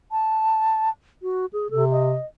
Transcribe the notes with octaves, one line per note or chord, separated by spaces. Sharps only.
A5
F#4
G#4
C3 A4
D#5